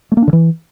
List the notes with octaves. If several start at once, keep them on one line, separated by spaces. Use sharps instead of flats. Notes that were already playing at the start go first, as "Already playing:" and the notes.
A3
A#3
D4
D3
E3